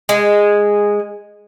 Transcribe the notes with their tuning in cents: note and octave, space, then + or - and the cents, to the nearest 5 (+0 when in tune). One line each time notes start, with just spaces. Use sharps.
G#3 -10